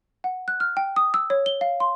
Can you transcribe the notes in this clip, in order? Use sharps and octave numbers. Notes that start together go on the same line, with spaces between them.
F#5
F#6
F6
G5
D#6
E6
C#5
G7
F5
C6